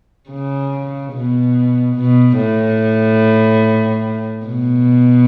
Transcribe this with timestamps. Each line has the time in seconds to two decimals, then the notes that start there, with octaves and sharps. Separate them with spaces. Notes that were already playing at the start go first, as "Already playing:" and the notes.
0.30 C#3
1.13 B2
1.96 B2
2.38 A2
4.46 B2